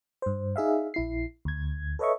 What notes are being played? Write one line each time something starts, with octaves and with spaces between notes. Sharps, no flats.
G2 C5
D#4 G#4 E5 F5
A#1 E4 C7
D2 G#6
A4 B4 C#5 D#5 E5 C#6